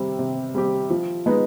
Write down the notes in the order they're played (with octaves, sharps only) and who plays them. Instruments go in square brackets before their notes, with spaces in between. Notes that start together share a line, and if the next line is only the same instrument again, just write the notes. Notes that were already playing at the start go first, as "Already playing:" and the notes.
Already playing: [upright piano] C3 G3 C4 G4
C3
G3 C4 G4
F3
G#3 B3 D#4